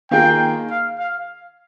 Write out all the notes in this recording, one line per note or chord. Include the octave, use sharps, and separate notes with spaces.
D#3 A#3 F4 G#4 G5
F5
F5